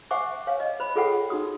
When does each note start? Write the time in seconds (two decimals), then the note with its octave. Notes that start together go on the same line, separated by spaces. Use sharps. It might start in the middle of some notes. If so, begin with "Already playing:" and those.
0.11 C5 E5 F#5 G#5 C#6 D6
0.47 C#5 F5 G#5
0.60 D#5
0.80 C5 B5
0.96 F4 G#4 A4 C#5 F#5 G5
1.30 D#4 F#4 D#6